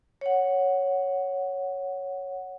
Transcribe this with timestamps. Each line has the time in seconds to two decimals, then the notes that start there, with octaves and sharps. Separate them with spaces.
0.21 C#5 F#5